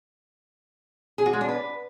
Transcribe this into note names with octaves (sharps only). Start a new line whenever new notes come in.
G#4
F#4
G#3
D4
B4